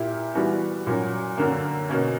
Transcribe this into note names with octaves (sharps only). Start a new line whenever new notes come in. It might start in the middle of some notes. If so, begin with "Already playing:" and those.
Already playing: A#2 A#3 E4 G4
E3 G3 B3 F#4
A#2 F#3 C#4 F#4
F#2 D3 A#3
B2 A#3 C#4